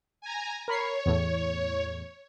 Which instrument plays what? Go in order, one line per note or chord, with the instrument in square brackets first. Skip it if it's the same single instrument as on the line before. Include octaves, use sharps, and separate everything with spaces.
[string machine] G#5 A#5
[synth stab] A#4 B5 C7 [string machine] C#5
[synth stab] E2 A2